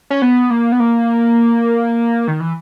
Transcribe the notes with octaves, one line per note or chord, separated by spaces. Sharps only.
C#4
B3
A#3
B3
A#3
D#3
E3